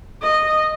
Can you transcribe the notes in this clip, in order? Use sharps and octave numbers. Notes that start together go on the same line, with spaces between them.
D#5